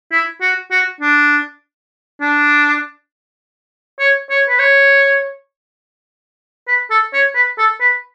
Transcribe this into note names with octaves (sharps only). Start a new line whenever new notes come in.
E4
F#4
F#4
D4
D4
C#5
C#5
B4
C#5
B4
A4
C#5
B4
A4
B4